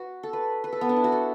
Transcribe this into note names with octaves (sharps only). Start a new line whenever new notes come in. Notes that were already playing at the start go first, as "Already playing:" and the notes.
Already playing: F#4 B4
A4
B4
B4
A4
B3
D4
E4
F#4
A4